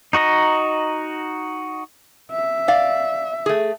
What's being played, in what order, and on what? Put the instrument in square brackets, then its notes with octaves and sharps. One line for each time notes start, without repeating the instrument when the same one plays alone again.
[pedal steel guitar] D#4 F#4 D#5 A#5
[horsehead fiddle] E5
[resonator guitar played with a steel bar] D5 F5
A3 G#4